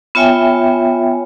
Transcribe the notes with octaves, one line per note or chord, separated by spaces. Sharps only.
B3 F4 C#5 E5 G5 G#5